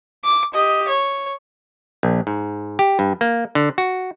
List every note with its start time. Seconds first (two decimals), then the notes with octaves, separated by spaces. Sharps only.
0.24 D6
0.54 G4 D#5
0.88 C#5
2.03 A#1
2.27 G#2
2.79 G4
2.99 G2
3.21 A#3
3.55 D3
3.78 F#4